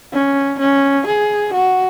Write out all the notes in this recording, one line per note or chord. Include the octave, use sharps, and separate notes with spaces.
C#4
C#4
G#4
F#4